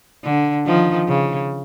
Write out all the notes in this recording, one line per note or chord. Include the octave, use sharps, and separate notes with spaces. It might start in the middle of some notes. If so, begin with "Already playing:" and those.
D3
D#3 F3
C#3